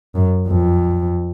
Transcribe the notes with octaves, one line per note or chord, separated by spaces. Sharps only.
F#2
F2